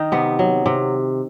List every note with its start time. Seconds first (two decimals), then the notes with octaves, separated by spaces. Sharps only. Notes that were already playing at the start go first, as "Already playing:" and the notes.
Already playing: D#3 D#4
0.12 C3 B3
0.39 F#3
0.66 C3